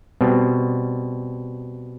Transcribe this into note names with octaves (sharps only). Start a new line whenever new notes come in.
B2 G3 C4